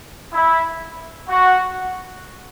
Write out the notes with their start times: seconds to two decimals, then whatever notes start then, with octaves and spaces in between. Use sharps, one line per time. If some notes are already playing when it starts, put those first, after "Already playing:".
0.33 E4
1.28 F#4